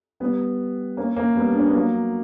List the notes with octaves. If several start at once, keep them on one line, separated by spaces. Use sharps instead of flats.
G3 B3
A#3 C#4
A#3 C#4
G3 B3
D4
C#4
B3
F#3 A#3